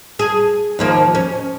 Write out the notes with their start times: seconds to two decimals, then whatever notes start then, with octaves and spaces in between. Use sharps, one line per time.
0.19 G#4
0.79 D#2 F3 A#3
1.15 C#4